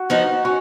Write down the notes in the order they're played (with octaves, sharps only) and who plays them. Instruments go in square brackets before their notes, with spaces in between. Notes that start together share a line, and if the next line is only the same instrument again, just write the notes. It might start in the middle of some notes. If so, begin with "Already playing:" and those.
Already playing: [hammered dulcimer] F#4
[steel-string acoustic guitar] F3 B3 D#4
[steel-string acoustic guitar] C#4 [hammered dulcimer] F#4